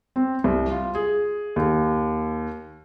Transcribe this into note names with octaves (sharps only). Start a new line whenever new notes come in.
C4
C2
F4
G#4
D#2